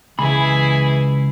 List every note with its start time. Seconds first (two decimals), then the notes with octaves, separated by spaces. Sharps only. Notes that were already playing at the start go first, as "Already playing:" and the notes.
0.19 C#2 E3 E4 G#4 B5